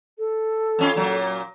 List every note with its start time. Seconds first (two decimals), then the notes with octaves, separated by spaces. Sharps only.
0.18 A4
0.79 F2 C#4 F4
0.96 A#2 F#3